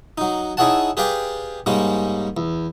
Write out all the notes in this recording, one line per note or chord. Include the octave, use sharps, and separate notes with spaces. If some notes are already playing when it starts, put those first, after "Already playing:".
F#3 D#4
D#4 E4 G#4 C#5 F#5 A5
G4 G#4 B4 D5 F5 G5
G#2 G3 G#3 A#3 C#4
E2